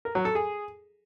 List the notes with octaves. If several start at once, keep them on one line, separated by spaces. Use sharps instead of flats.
A#4
F#3
A4
G#4